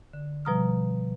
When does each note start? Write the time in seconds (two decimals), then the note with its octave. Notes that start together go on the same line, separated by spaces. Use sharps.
0.13 D3
0.45 B2 F3 G3 A#5 D#6 F6